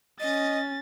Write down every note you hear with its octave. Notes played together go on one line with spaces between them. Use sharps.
C#4 D#5 A6